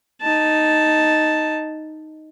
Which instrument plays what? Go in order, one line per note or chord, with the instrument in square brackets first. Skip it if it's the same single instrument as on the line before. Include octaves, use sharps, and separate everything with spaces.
[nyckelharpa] D#4 A5